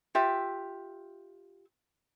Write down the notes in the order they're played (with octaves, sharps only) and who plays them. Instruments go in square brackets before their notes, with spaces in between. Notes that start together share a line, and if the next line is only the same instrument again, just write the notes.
[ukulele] F4 G4 E5